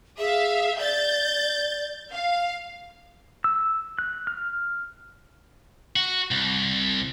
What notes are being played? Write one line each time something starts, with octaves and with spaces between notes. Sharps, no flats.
G#4 E5 F5
D5 G6 A6
F5
E6
F#6
F6
F#4
C2